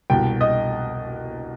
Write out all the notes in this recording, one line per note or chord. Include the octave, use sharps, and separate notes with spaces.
C2 B2 G5
D#5